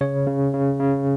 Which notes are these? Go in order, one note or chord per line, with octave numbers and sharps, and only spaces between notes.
C#3 C#5
C#3
C#3
C#3